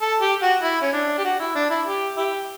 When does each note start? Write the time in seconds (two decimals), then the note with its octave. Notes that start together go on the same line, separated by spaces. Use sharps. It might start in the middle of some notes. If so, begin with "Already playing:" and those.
0.01 A4
0.21 G4
0.42 F#4
0.62 E4
0.81 C#4
0.93 D4
1.18 G4
1.24 F#4
1.40 E4
1.55 D4
1.70 E4
1.86 G4
2.17 E4 G4